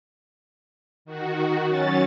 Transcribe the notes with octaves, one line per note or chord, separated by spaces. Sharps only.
D#3 F#4
F#3 C#4 A6